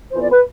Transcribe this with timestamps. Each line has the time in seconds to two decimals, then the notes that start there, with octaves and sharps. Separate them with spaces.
0.12 F2 E3 B3 F4 C5
0.23 D5
0.32 B4